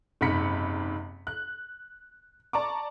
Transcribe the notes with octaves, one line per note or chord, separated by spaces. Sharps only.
F#1 G#2 C3 B5 B6 C#7
F#6
D5 A5 A#5 C#6 D6